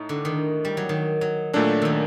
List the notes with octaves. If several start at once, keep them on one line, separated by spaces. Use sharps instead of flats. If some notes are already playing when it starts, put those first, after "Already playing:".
Already playing: A2 D#4
D3
D#3
G3
F#3
D#3
F#3
A#2 F#3 A3 D4 A4
D#3 F#3